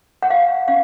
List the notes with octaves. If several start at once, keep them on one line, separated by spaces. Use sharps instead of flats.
F#5
F5
C#4 F5